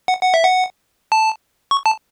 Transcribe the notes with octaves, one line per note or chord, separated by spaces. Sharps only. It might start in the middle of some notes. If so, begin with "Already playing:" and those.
F#5
F#5
E5
F#5
A5
C#6
A5